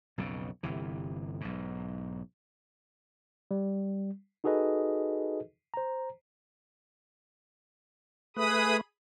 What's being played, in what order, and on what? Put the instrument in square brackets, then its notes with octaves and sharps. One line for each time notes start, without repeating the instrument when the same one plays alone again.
[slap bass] B1 F2 C#3
G1 C3 E3
B1 G#2
[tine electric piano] G3
D#4 F#4 G#4 A4 B4 D#5
C5 A#5
[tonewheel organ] A3 B4 [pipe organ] G#4 B5 D#6